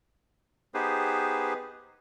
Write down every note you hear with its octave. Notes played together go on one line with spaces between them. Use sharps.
B3 D#4 G4 G#4 B4 C5